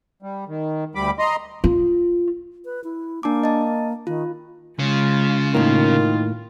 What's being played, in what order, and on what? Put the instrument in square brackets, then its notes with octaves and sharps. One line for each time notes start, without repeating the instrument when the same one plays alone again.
[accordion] G3
D#3
D2 G3 B5 D6
D#5 A#5 C6
[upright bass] F4
[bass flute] B4
E4
[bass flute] A#3 [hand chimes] D4 A5 D6
[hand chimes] D#5 A5
[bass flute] D#3 [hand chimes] F4
[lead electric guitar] C#3 [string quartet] G#3 F4
[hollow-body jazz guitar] A2 A#3 [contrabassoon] D#3 [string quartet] F4